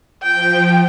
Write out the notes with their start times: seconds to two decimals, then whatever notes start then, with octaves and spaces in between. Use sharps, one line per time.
0.22 F3 G5